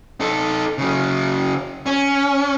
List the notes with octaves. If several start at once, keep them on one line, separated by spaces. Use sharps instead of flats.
D#4 A4
C#3 F#3
C#4